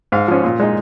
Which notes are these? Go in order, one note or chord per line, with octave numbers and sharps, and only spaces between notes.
G#2 F5
F3 C#4
A#2
G#3 D#4